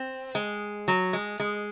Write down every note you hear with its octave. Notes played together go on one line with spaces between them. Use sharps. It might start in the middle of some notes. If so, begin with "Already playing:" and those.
Already playing: C4
G#3
F#3
G#3
G#3